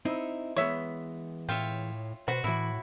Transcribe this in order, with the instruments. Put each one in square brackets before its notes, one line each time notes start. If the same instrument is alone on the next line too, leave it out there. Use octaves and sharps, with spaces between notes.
[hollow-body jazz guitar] C4 D#4 E4
[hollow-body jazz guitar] E3 G#3 B3 [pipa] C#5 E5
[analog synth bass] A2 [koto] F4 C#5 E5 [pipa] G5
[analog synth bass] B2 [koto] F#4 [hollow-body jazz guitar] B4 C5 F#5
[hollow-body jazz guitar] E2 E3 [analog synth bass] A2 [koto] E4